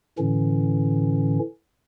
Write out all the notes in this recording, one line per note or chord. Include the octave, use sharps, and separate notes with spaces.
A2 D3 E3 C#4